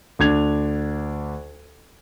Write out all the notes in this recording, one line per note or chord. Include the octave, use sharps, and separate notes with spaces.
D2 D4 G#6 F7